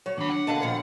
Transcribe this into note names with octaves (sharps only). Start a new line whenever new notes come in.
F#3 C#5
D#2 D4 B5
F#5
B2 D3 A#3 D#5 A5
A#2 D#3 F3